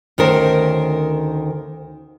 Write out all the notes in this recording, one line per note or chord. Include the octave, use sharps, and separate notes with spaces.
D2 D#3 C#4 A#4 C5